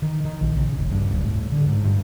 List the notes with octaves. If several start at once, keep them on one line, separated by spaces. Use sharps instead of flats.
D#3
D#3
A#1
C#3
E1
G2
D1
A2
D3
G#2
G2